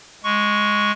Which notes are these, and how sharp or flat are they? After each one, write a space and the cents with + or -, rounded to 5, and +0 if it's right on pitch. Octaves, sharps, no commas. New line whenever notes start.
G#3 +0 C#6 +0